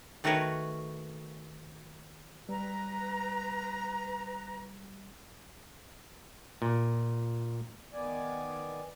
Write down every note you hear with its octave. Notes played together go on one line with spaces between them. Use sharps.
D#3 A3 F#4 A#4 B4 C#5
G3 B4 A#5
A#2
D#3 B3 D5 G#5